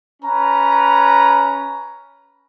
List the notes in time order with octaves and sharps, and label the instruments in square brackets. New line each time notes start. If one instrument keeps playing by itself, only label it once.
[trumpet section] C#4 B4 A#5